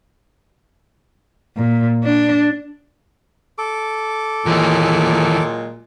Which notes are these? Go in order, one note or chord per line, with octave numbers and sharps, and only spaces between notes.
A#2
D4
A4 D6
D#2 A#2 E3 F#3 G#3